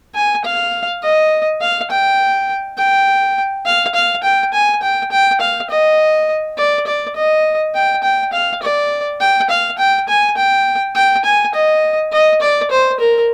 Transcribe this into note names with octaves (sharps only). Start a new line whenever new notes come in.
G#5
F5
D#5
F5
G5
G5
F5
F5
G5
G#5
G5
G5
F5
D#5
D5
D5
D#5
G5
G5
F5
D5
G5
F5
G5
G#5
G5
G5
G#5
D#5
D#5
D5
C5
A#4